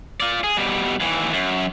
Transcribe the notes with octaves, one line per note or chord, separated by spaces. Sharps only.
F4 D5
G#4
B2 G3
D#2 E3
F#2